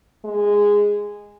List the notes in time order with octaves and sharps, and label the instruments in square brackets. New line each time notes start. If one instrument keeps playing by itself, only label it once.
[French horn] G#3